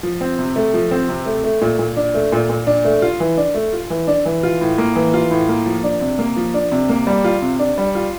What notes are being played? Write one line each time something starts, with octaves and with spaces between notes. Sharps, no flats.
F3
C4
C3
A3
F3
C4
C3
A3
A3
A#2
A#2
D4
A3
A#2
A#2
D4
A3
F4
E3
D4
A3
F4
E3
D4
E3
F4
A2
A#3
E3
F4
A2
A#3
F3
D4
C3
A#3
F3
D4
C3
A#3
G3
F4
C3
D4
G3
F4